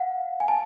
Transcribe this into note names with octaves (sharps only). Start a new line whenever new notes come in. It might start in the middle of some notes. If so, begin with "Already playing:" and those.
Already playing: F5 F#5
G#5
A5